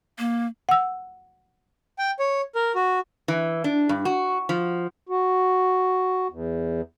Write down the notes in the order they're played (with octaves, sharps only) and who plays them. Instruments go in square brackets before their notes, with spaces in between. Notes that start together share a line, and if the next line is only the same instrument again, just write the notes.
[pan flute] A#3
[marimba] F#5 E6
[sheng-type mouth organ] G5
C#5
A#4
F#4
[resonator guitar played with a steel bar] E3
D4
G2
F#4
F3
[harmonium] F#4
E2